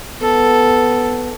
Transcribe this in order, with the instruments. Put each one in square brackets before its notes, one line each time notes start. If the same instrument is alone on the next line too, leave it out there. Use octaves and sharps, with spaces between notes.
[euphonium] B3 [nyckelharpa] A4